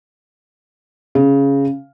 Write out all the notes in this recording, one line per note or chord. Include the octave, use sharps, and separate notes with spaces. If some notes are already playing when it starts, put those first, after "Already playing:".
C#3